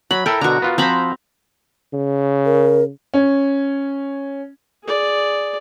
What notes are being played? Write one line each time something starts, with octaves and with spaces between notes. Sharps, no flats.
F#3 B5
E4 A4 A#4 G5
B2 D3 F#4 A#5
B3 F4
F3 C4 C5 A#5 B5
C#3
A#4
C#4
G#4 D5